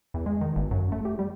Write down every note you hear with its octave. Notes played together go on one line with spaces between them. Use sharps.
E2
G#3
D#3
G1
F#2
A3
G4
G3